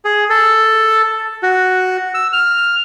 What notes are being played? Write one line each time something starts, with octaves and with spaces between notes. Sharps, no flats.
G#4
A4
F#4
E6
F6